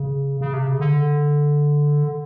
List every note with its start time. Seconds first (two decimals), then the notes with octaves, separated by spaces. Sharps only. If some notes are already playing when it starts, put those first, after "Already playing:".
Already playing: C#3
0.41 C#3
0.53 C3
0.67 C#3
0.80 D3